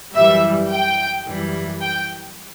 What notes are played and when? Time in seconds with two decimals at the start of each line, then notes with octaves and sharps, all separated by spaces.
0.14 F#2 E3 G3 E5
0.70 G5
1.26 F#2 E3 G3
1.82 G5